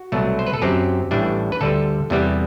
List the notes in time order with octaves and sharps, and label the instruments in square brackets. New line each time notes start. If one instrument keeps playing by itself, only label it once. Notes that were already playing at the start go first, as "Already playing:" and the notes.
Already playing: [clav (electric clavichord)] F#4
C2 B2 F#3 A3
C5
B4
A4
F#2 F#3 C4 G4
A1 A2 E3 G3 D4
B4
D2 D3 G3 A4
E2 C3 G3 B3